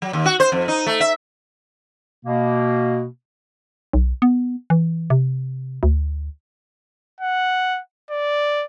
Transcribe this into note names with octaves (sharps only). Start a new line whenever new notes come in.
F#3
D#2
F#4
C5
F2
D#4
A3
E5
B2 A#3
B1
B3
E3
C3
D2
F#5
D5